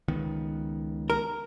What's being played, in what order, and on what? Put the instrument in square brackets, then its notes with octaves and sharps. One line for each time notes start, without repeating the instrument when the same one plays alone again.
[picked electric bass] C#2 D#3 B3
[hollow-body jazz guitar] A#4